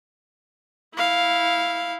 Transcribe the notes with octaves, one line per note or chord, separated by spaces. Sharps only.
E4 F5